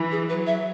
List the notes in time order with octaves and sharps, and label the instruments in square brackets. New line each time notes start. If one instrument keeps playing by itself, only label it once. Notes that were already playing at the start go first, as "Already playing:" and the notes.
Already playing: [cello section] E3
[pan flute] G#4
[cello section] F#3 [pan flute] B4
[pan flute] E5